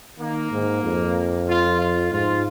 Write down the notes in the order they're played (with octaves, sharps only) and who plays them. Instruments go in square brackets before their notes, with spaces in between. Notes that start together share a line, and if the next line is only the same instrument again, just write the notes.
[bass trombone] D#3 [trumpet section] A#3
[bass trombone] G#2
F2
[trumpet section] F4
F4
[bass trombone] G#2 [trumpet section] F4